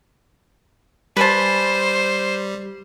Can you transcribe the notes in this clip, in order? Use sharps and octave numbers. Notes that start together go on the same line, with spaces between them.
G3 B4 C5 G#5 A5